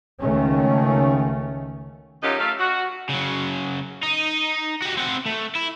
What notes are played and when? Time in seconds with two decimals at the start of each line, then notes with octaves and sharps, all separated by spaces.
0.20 C#2 D#3 A3 C#4
2.23 F#2 F#3 C#4 D#4 F4 G4
2.39 A3 F5
2.59 F#4
3.10 C#3 F#3
4.03 D#4
4.82 F#4 G4
4.97 C4 F#5
5.25 A3
5.55 E4